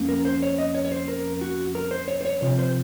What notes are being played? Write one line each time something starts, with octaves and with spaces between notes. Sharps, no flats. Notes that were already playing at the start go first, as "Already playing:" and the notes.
Already playing: F2 A#3 C#4
A#4
C5
C#5
D#5
C#5
C#5
C5
A#4
F#4
A#4
C5
C#5
C5
C#5
C3 F3 C4 C#5
C5